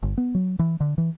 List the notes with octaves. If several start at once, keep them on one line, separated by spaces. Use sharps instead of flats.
G1
B3
F#3
E3
D3
E3